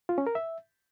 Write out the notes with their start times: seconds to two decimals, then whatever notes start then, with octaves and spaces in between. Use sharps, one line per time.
0.09 F4
0.18 C#4
0.27 A#4
0.35 E5